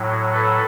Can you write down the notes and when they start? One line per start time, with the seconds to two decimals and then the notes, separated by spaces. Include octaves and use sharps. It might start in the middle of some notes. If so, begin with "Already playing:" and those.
Already playing: A2 F#3
0.32 A4 B4